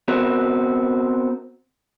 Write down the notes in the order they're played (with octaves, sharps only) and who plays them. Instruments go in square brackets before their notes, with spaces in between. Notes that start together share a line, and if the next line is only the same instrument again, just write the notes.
[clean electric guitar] B3 C4 F#4 A#4